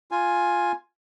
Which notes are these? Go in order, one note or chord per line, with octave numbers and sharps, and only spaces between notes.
F4 G#5